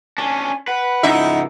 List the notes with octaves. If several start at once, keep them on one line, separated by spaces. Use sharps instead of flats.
C#4 D4 G#5
B4 F#5
C#2 G#2 D#4 E4 E5